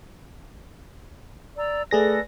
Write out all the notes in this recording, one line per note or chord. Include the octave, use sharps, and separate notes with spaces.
D5 A#5 E6
A3 G#4 A4 B4 D5 A#6